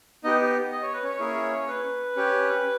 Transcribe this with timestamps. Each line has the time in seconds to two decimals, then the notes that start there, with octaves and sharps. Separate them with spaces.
0.24 B3 D#4 G4 D#5
0.72 D#5
0.82 C#5
0.93 B4
1.03 C#4 C#5
1.19 A#3 E4 G#4
1.68 B4
2.16 C#4 G4